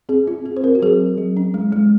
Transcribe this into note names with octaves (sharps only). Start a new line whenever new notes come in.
C4 G#4
C4 F4
C4 G#4
C5
C4 A#4
F#4
F#3 G#4
C4
F#3
C#4
G#3
G#3